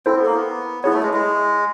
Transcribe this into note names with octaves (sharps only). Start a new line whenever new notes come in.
C4 E4 A4 C5
B3
A#3
B3
B3 E4 G#4 C#5
A3
G#3
G#3